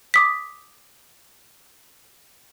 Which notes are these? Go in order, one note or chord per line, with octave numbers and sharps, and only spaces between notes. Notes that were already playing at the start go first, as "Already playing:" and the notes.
D6 D#6 B6